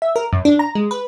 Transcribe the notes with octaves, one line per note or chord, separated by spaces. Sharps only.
E5
A#4
F#2
D4
A#5
G#3
B4